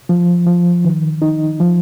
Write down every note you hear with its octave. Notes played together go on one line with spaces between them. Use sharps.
F3
F3
D#3
D#4
F3